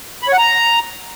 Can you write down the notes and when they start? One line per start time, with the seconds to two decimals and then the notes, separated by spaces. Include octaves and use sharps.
0.23 B5
0.28 C#5
0.33 F#5
0.38 A#5